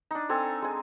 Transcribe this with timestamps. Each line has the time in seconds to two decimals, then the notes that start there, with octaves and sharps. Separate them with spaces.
0.11 D4 D#4
0.29 C4 A4 G#5 A#5
0.62 G#3 G#5